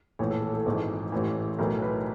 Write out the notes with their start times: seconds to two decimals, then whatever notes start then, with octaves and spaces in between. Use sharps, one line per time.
0.19 A#1 A2 E3 C#5
0.31 A4
0.42 A4
0.54 A4
0.66 G#1 G#2 E3
1.12 A1 A2 E3
1.58 B1 A2 E3 A#4
1.82 B4